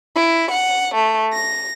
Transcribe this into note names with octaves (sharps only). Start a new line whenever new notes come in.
E4
F#5
A3
A#6